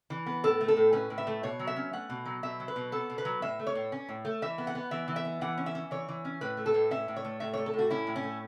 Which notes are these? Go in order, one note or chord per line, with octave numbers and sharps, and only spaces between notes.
E3
B3
A2 A4
A3
A4
A2
C#4 B4
A2
E5
A3
B2 C#5
F#3
E5
C#4
A3 F#5
B2
F#3
B2 E5
F#3
B4
B2
B3 A4
B2
B4
F#3
A2 E5
A3
C#5
A2
C#4
A2
A3
E3 E5
B3
F#5
B3
E3 E5
E3
E5
B3
E3 F#5
C#4
E5
C#4
E3 C#5
E3
C#4
A2 B4
A3
A4
A2
C#4 E5
A2
C#5
A3
A2 E5
A3 C#5
A4
A2
F#4
C#4 E4
A2
C#4
A3